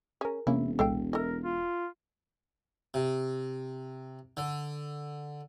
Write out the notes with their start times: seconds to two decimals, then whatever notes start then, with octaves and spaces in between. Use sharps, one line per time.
0.21 C#4 G#4 A#4
0.47 E1 C3 A#3 C#4 E4
0.79 C2 A#2 G#3 A4 F5 G5
1.13 E4 A4 A#4 D#5
1.44 F4
2.94 C3
4.37 D3